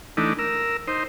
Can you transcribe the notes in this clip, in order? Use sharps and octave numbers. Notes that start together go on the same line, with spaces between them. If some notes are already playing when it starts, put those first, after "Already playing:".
E3 A3 D4 D#4
A#4 E6
D#4 C5